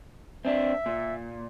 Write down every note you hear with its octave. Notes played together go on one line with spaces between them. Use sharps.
C4 D4 E5
A#2